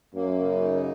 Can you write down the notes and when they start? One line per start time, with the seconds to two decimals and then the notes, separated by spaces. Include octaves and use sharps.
0.15 F#2 A#3
0.37 C#3
0.61 D#4